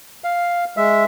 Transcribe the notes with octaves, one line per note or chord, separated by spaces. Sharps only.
F5
G#3 E5